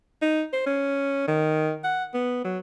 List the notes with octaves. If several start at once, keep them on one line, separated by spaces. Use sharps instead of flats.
D#4
C5
C#4
D#3
F#5
B3
F#3